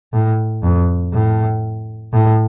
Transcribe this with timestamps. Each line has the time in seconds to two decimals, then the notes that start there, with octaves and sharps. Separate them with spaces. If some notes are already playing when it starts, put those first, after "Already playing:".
0.13 A2
0.63 F2
1.13 A2
2.13 A2